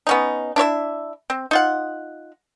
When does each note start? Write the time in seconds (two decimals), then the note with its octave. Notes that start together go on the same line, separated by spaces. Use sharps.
0.07 B3 C#4 D#4
0.56 D4 E4 C#5 E5
1.30 C4
1.51 D#4 F4 F#5